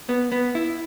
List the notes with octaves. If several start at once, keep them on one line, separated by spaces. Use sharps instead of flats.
B3
B3
E4